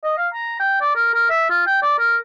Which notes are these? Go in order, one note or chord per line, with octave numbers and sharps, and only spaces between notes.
D#5
F5
A#5
G5
D5
A#4
A#4
E5
F4
G5
D5
A#4